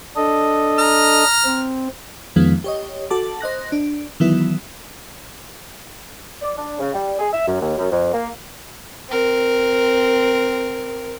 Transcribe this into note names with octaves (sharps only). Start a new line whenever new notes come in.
D4 A4 D#5
A#5 F6
C4
F2 D#3 F3 G#3 B3
G4 C#5 D#5
F#4 A4 A5 D6
C5 D#5 F#6 A#6
D4
D#3 E3 F#3 B3 E4
D5
D4
C#3
G3
G#4
E5
F#2
D#2
F#2
F2
A#3
C4 A#4